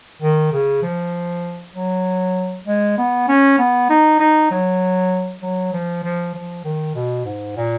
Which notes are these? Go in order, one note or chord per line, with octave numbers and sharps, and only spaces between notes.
D#3
C#3
F3
F#3
G#3
B3
C#4
B3
D#4
D#4
F#3
F#3
F3
F3
F3
D#3
B2
G#2
A#2